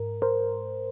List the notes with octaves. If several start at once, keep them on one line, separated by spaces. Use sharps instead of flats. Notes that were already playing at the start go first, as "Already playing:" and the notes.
Already playing: G#2 A#4
A#4 C5